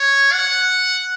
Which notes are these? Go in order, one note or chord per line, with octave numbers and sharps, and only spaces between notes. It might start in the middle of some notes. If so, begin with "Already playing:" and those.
Already playing: C#5
F#5